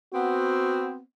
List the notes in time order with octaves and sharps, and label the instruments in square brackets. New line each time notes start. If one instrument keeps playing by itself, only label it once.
[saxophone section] B3 C4 [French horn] F#4